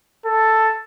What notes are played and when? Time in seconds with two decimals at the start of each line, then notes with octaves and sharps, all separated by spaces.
0.26 A4